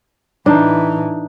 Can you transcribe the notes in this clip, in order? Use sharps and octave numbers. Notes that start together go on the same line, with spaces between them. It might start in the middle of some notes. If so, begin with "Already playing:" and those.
A2 E3 D4 D#4